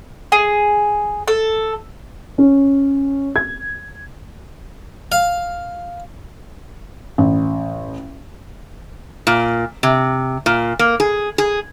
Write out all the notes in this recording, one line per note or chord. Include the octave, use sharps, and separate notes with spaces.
G#4
A4
C#4
G#6
F5
A1
A#2
C3
A#2
A#3
G#4
G#4